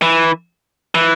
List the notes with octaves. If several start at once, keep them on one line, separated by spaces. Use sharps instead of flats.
E3
E3